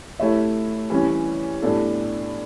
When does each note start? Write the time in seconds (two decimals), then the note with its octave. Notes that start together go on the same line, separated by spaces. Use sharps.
0.20 A3 E4 G4 C#5 E5
0.90 E3 G3 C#4
1.62 A2 G3 B3 D4 A4